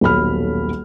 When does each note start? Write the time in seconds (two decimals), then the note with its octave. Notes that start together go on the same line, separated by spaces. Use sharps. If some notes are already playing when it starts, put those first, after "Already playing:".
0.01 D#1 B1 B5 F6